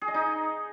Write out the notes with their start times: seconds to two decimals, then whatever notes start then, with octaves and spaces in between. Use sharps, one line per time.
0.02 G#4
0.08 D#5
0.14 D#4